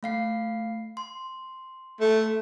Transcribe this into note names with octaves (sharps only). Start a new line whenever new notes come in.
A3 F5 C7
C6
A3